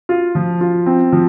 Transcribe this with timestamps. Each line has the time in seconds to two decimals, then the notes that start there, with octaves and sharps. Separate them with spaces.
0.09 F4
0.35 F3
0.61 F4
0.86 C4
1.12 F3